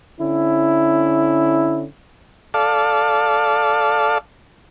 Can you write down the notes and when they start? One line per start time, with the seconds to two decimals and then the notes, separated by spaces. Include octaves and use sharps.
0.19 D3 C#4 E4
2.54 A4 D5 F5